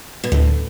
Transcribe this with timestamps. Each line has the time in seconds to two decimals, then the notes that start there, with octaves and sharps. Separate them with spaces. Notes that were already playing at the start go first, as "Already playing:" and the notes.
0.24 B2
0.32 D2 A2